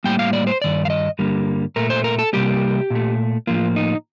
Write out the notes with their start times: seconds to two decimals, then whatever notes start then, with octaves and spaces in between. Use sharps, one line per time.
0.04 A2 G3 A#3 G5
0.19 F5
0.33 D5
0.47 C5
0.62 G2 D#3 D5
0.85 F5
0.90 D#5
1.19 G2 D3 G3 A#3
1.76 A#2 A3 A#4
1.90 C5
2.04 A#4
2.19 A4
2.33 C3 G3 A#3 G4
2.90 A#2 A3
3.47 A2 F3 A#3 F4
3.76 D#4